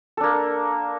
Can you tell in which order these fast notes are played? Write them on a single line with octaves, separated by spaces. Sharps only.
A4 D4 A#3